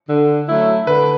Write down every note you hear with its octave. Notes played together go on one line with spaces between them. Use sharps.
D3
F#3 A3 C#4 E4
D3 B4